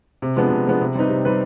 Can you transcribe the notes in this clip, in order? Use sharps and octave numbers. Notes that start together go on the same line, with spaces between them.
C3
F3 G#3 B3 D4
C3
F3 G#3 B3 D4
C3
G3 C4 D#4 B4
C3
G3 C4 D#4 B4